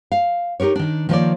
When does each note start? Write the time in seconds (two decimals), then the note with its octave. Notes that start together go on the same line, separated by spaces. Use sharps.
0.12 F5
0.60 D#4 G4 A#4 C#5
0.76 D#3 D4
1.09 D#3 F3 A#3 B4 C#5 D5